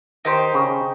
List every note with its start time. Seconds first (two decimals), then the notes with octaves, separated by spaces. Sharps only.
0.25 D#3 D#4 G4 C5
0.54 C#3